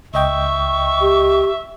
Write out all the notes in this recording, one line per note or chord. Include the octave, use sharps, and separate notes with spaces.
C#2 D#5 E5 G5 C#6
G4